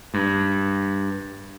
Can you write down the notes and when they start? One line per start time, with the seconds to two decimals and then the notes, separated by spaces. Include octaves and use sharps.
0.14 G2